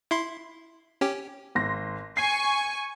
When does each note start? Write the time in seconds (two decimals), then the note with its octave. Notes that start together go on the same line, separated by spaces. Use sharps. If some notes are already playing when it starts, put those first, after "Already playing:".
0.11 E4 C6
1.01 C#4 G4
1.55 G#1 C6 A#6
2.17 G#5 C#6 C7